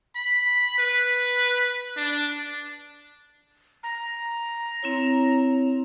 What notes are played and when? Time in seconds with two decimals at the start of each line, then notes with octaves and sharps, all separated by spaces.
0.16 B5
0.79 B4
1.97 D4
3.83 A#5
4.83 C4 E4 C#5